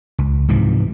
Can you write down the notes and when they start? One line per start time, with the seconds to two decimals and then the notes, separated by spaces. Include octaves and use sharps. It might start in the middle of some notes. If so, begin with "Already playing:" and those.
0.18 C#2
0.48 G#2 C3 E3 F3